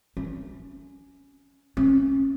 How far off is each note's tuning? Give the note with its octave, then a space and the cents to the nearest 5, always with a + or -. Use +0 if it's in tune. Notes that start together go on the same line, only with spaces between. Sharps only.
C#4 +10
C#4 -25